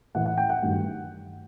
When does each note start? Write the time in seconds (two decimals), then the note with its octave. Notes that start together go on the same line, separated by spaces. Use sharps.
0.14 A2 E3 A3 F#5
0.26 F#5
0.38 G5
0.50 F#5
0.62 G2 D#3 F#3 A3